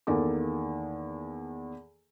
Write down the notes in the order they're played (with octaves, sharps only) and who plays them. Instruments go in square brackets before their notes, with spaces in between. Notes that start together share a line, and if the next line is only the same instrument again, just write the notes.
[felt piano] E2 D#3 A#3 A4 D6